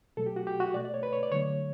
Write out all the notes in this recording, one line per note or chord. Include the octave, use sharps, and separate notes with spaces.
B2 F#3 A3 A4
G4
F#4
G4
F#4
B2 A3 D5
D5
C#5
B4
C#5
D5
D3 F#3 A3 C#5